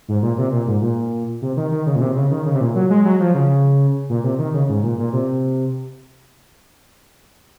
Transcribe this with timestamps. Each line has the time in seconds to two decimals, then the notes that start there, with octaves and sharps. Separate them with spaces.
0.08 G#2
0.22 A#2
0.38 C3
0.52 A#2
0.67 G#2
0.82 A#2
1.42 C3
1.57 D#3
1.71 D#3
1.86 C#3
1.96 A#2
2.01 C3
2.16 C#3
2.31 D#3
2.46 C#3
2.55 C3
2.61 A#2
2.75 F#3
2.90 G#3
3.05 F#3
3.20 F3
3.34 C#3
4.09 A#2
4.24 C3
4.39 D#3
4.54 C#3
4.69 G#2
4.83 A#2
4.99 A#2
5.13 C3